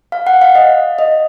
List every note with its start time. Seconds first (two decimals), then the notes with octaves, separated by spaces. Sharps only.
0.12 F5
0.27 F#5
0.42 F5
0.55 D#5
0.99 D#5